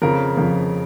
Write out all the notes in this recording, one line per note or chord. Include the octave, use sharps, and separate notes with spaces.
F2 C#3 F3 A#4
F2 C#3 F3